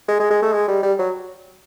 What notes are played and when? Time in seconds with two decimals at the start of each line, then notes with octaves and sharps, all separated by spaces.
0.08 G#3
0.20 G#3
0.31 G#3
0.42 A3
0.53 G#3
0.68 G3
0.83 G3
0.99 F#3